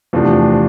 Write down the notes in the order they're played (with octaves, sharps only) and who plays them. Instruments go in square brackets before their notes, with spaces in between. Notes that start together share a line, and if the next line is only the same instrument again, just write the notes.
[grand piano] E2 C3 E3 A3 D4 [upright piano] F3